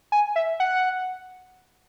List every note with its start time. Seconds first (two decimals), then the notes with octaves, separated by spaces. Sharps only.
0.12 G#5
0.36 E5
0.60 F#5